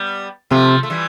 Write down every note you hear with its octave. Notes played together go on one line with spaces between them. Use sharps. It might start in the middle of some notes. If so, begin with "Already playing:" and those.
Already playing: G3 B3
C3 F3 A3
A3
E3 G3